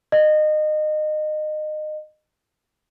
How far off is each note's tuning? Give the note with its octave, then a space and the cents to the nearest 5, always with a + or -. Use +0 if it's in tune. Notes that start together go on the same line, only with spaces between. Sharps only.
D#5 -25